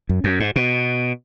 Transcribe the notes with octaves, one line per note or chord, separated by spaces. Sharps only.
F#2
F#2
G#2
B2